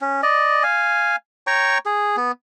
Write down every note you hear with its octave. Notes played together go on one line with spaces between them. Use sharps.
C#4
D5 D#5
F5 G#5
C#5 G5 A#5 C#6
G#4
B3